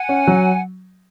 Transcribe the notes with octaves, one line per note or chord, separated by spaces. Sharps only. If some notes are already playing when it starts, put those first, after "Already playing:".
Already playing: F#5 G#5
C#4
F#3